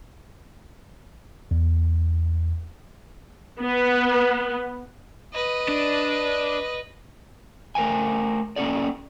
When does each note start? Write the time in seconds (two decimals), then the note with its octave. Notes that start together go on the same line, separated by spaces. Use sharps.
1.51 E2
3.59 B3
5.33 B4 D#5
5.68 D4
7.75 A3 A#4 C5 G5 G#5
8.56 A#3 C#4 D#4 A4 D5